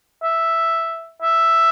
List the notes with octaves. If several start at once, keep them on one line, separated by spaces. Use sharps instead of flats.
E5
E5